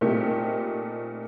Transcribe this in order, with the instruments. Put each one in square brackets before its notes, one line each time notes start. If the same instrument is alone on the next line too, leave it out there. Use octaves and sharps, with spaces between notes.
[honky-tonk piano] A#2 A3 C4 D#4 G4